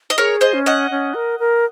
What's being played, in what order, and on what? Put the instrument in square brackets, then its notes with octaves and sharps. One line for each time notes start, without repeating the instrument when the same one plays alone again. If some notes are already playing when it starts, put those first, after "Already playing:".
[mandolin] D#5
[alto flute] G#4 [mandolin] A#4 C#5
[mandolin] C5 D#5
[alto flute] C#4
[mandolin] D#5 F#5
[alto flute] C#4
A#4
A#4